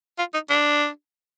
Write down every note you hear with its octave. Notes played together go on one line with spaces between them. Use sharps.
F4
D#4
D4